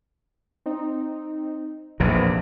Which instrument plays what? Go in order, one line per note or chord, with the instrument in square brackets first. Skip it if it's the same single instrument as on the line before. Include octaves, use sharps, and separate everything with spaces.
[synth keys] C4 D#4
[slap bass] A#1 E2 C3 [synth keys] B4